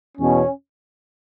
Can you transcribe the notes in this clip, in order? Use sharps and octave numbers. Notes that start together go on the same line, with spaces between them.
E2 B2 C#4